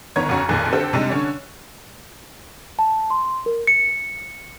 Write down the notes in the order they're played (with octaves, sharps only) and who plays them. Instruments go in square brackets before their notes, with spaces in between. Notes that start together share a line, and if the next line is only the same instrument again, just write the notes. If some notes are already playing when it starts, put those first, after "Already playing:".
[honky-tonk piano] G1 D#3 B3 C#5 A#5 G#6
F2 C#3 F#4 C#5 A#5
B1 F2 A#2 D#3 G#4 F#6
D3 C4 G4 A4
C3 G3 G#3 D4 D#4
D3 C#4 D4 C#5
[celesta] A5
C6
A#4
C#7